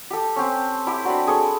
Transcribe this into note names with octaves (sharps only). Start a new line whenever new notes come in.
G4 A4
C4 C#4
E4 G4
F#3 C4 D4 B4
G#4 A4 C#6